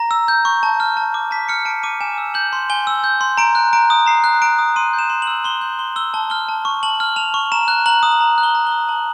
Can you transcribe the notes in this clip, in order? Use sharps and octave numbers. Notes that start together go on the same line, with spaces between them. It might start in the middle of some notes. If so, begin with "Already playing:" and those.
Already playing: A#5 A#6
E6
G6
C#6
A5
F6
A5
D6
A5 B6
F6 C#7
A5 D7
D6 D#7
G#5 E7
E6
G6 F#7
C6
G#5 G7
E6
G6
C6
A#5 D7
F#6
A#5 D7
D#6
A#5 C7
F#6
A#5 D7
D#6
C6 D#7
G6
E7
C6
F#7
E6
C6 G7
G6 G7
C6 G7
E6 G7
A5 G7
F6 G7
A5
C#6
A5 F#7
F6
A5 F7
C#6
A#5 E7
F#6
A#5 F#7
D#6
A#5 F#7
F#6
G7
A#5
G7
D#6
A5 F#7